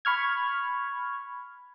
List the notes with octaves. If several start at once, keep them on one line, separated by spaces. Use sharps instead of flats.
B5 C#6 F6 G#6